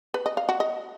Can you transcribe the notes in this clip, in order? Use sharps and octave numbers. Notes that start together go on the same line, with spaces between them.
B4
D#5
F5
F#4
D#5